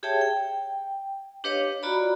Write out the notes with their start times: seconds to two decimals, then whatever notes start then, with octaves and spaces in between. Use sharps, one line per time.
0.03 G4 G#4 C#5 E5 G5 A5
0.21 G5
1.44 D4 G4 B4 C#5 D#5 F5
1.83 F4 F#4 D5 A#5 B5